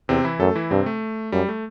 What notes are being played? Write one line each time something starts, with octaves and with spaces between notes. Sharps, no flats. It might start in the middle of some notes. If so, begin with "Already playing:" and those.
E2 C3 C4
E3 E4
F#2 A3 A4
E3 E4
G2 C3 C4
A3
F#2 G3
A3